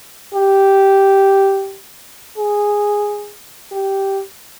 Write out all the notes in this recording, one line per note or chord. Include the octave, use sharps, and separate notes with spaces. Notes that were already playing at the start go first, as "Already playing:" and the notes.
G4
G#4
G4